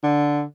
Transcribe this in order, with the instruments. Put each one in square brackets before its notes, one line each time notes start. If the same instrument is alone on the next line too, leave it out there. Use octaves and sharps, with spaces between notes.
[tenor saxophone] D3